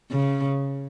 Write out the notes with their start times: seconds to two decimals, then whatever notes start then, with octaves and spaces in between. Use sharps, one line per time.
0.11 C#3